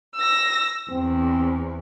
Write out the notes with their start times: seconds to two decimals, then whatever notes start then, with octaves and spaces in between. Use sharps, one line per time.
0.16 E6 A#6
0.91 E2 C4